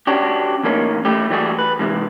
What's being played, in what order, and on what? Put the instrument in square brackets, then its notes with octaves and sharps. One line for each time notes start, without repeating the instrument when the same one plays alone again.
[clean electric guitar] C#4 D4 F#4 G4
E2 A2 A#3 C#4 D#4
A3 E4 G4
E3 G3 A3 F#4 G#4
B4
G#2 C3 D#3 E3